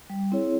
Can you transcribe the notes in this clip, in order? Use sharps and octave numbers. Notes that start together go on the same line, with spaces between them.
G3
C4 E4 G#4 C#5